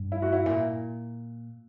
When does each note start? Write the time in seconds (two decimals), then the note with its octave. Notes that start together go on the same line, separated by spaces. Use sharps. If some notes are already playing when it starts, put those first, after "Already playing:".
Already playing: G2
0.12 E4
0.22 F#4
0.33 E4
0.46 A#2